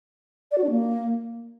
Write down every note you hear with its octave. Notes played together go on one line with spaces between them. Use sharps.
D5
F#4
D4
A#3